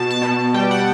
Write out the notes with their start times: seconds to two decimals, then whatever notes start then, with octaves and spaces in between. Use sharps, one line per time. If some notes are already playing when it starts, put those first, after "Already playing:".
Already playing: B2 A5
0.11 A5
0.22 B2
0.54 G3 G5
0.71 F#5